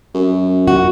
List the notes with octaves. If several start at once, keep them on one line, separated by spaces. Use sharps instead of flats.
F#2
F#4